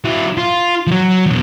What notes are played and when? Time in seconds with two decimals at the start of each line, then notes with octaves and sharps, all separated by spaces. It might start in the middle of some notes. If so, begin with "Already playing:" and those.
0.04 F#3 E4
0.37 F4
0.87 F3 F#3
1.26 E2 B2